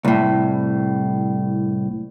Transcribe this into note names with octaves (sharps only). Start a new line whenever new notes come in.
C2 A2